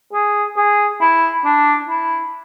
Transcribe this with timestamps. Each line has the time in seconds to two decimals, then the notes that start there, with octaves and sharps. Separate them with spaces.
0.13 G#4
0.57 G#4
1.01 E4
1.45 D4
1.89 E4